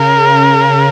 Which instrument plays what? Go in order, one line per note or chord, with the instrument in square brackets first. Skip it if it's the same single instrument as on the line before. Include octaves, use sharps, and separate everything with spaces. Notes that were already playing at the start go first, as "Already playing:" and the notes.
Already playing: [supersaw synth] C#3 [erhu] A#4